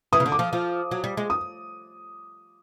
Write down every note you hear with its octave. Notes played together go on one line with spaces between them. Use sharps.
E3 D#6
C#3
D3
D6
F3
F3
F#3
G3
G#3
D#6